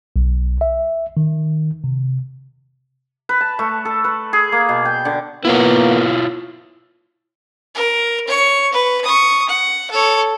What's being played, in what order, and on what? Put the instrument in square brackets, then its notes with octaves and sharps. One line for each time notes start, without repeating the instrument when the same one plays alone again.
[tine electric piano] B1
E5
D#3
C3
[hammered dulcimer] B4
A5
A3
A4
B4
G#4
A#3
B2
G5
D3
[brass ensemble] A#3 B3 [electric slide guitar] E4 F4 C#5
[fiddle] A#4
C#5 C#6
B4
C#6 D#6
F#5
A4 C#5